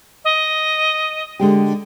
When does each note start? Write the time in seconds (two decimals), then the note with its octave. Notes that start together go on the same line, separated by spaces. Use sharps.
0.25 D#5
1.40 D3 G#3 G4